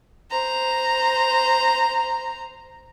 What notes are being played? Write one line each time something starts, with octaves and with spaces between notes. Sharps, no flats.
C5 A#5